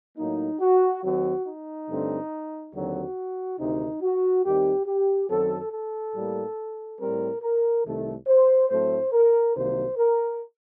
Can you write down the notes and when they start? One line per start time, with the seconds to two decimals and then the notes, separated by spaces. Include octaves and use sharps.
0.18 A2 F#3 A#3 D#4
0.60 F#4
1.03 D#2 D#3 F#3 C4 F#4
1.46 D#4
1.88 G2 D3 A3 C4
2.73 D#2 D3 F#3 C4 F#4
3.58 D2 C3 D#3 D#4
4.02 F#4
4.44 D#2 D#3 G3 C4 G4
4.86 G4
5.29 F#2 D#3 F#3 C4 A4
5.71 A4
6.14 A2 G3 A#3
6.99 A2 G3 C4 A#4
7.42 A#4
7.84 C2 C3 D#3 A3
8.27 C5
8.69 A2 F#3 A3 C4 C5
9.12 A#4
9.54 C2 C3 D#3 F#3 A#3 C5
9.97 A#4